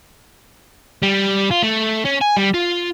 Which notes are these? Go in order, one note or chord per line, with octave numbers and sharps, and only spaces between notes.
G3
F4
A3
C#4
G#5
G3
F4